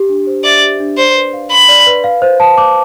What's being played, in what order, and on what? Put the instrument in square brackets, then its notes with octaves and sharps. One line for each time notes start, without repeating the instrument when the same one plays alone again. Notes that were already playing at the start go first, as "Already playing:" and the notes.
Already playing: [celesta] G4
D4
C5
[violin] D5 [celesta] E5
[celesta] G4
D4
[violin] C5 [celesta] D5
[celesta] B4
F5
[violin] B5 [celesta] C6
[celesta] D5
B4
F5
C5
A5
D6